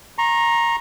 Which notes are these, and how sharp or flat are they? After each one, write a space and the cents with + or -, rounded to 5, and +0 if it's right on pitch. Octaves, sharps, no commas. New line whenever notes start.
A#5 +5 C#6 -40